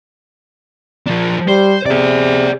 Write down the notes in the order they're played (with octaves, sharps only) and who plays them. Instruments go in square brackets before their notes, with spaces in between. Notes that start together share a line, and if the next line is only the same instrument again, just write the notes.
[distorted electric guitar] F3 D4
[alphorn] G3 [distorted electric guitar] C5
[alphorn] C3 [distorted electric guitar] G#4 D5